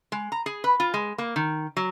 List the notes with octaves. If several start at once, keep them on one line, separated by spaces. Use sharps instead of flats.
G#3
A#5
G#4
B4
F4
G#3
A#3
D#3
F#3